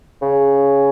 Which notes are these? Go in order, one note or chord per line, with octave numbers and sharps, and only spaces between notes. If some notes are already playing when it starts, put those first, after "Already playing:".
C#3